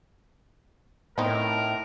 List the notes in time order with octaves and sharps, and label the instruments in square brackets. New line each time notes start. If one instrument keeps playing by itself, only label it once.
[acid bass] A2 [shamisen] B3 C4 D#4 [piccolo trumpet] A#4